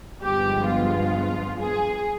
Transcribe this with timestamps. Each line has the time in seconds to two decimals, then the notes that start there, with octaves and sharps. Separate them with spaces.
0.22 G1 G2 F3 G#3 B3 G4
0.68 F4
1.60 G#4